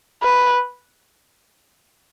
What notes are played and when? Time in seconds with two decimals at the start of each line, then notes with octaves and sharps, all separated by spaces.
0.23 B4